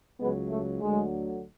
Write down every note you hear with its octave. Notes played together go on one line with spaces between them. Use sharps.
C#2 C#3 F#3 G#3 B3
A3
D2 D3 F#3 G#3